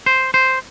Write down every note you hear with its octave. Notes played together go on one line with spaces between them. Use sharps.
C5
C5